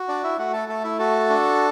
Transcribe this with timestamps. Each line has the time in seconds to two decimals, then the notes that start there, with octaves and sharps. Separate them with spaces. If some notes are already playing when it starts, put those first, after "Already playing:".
Already playing: F#4
0.08 D4 D5
0.24 E4 E5
0.38 A3 F#4 F#5
0.53 A4 A5
0.68 A3 A4 A5
0.84 E4 E5
0.99 F#4 A4 A5
1.29 D4